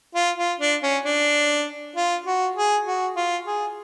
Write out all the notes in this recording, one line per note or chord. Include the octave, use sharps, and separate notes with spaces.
F4
F4
D4
C#4
D4
F4
F#4
G#4
F#4
F4
G#4